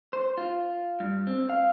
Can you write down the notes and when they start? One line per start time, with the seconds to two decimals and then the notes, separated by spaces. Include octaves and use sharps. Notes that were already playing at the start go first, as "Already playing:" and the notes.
0.13 C5
0.38 F4
1.00 G2
1.27 C4
1.50 F5